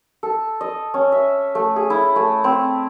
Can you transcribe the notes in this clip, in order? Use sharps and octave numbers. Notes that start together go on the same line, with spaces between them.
A4
D#5
C#4
E5
A3
G#4
E4
A3
C4